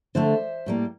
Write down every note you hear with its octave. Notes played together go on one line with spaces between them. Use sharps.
D3 A3 C5 E5
A2 G3 A#3